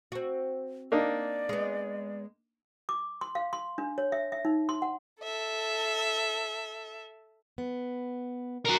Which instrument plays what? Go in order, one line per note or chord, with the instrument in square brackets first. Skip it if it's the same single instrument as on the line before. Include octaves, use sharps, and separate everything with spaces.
[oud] C4 F#4
[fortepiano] A#3 D4 D#4 [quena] D5
[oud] G#3 B3
[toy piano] D6
C6
F5
C6
D4
C#5
E5
E5
D#4
C6
F#5
[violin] A4 E5
[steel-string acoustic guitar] B3
[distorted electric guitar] F#4 A#4